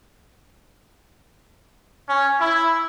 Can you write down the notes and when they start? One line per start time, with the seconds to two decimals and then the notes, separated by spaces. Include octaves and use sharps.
2.09 C#4
2.40 E4